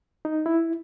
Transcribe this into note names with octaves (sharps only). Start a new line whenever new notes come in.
D#4
E4